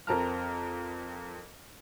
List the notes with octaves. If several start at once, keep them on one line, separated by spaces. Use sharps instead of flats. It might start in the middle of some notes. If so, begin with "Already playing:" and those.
F2 C4 A#4 A5 A#5 F6